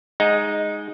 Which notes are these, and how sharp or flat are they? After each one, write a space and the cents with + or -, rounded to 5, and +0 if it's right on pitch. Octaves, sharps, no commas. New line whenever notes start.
G#3 +0 D#4 +0 F#5 -30